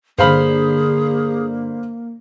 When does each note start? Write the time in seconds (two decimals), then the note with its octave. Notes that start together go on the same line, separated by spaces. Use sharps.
0.19 G2 D3 A#3 G#4 C5 F5 B5